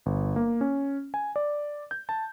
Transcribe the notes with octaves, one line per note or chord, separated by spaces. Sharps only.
G1
A#3
C#4
G#5
D5
G6
A5